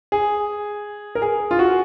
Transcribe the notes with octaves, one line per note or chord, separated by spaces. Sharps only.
G#4
A#4
G#4
F4
F#4